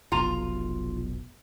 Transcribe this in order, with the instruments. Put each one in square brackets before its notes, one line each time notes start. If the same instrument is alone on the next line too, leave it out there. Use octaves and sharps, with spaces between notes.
[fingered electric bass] F1 B1 B2 [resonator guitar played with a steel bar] F4 A#5